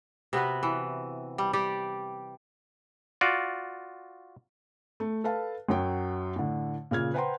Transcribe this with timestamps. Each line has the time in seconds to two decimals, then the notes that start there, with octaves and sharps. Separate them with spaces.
0.33 C3 B3 F#4 B4
0.63 E3
1.38 G3
1.53 G3 G4 D5
3.21 F4 F#4 D5
5.00 A3
5.24 A4 B4 F5 A5
5.69 F#2 F#3 G5
6.36 A2 D3
6.91 A#2 C#3 F6 G#6
7.14 B4 C5 F#5 G5 A#5 C6